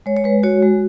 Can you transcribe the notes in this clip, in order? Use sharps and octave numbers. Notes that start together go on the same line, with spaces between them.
G#3 C#5
C#5
G#3 B4
F#4 C#5
G#3